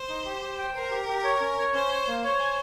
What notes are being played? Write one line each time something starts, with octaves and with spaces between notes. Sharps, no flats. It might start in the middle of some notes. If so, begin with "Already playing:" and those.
Already playing: C5
D#4
G4
G4
G5
A#4 C5
G4
G4
C#5
C#4
C#5
C#4 C5
C#5
A#3
C5 C#5
G#5